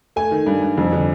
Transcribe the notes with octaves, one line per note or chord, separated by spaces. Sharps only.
A3 G#5
D#3
G2
G2
F2
D3